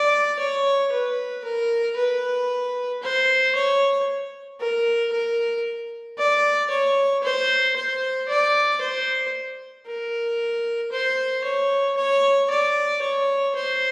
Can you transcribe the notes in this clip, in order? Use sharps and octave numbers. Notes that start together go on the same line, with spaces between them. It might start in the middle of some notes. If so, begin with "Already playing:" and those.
Already playing: D5
C#5
B4
A#4
B4
C5
C#5
A#4
A#4
D5
C#5
C5
C5
D5
C5
A#4
C5
C#5
C#5
D5
C#5
C5